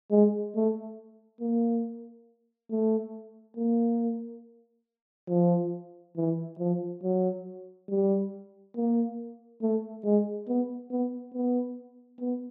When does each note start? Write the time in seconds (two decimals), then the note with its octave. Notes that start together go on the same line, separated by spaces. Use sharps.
0.11 G#3
0.55 A3
1.40 A#3
2.71 A3
3.57 A#3
5.29 F3
6.17 E3
6.59 F3
7.03 F#3
7.89 G3
8.76 A#3
9.62 A3
10.04 G#3
10.48 B3
10.91 B3
11.34 B3
12.20 B3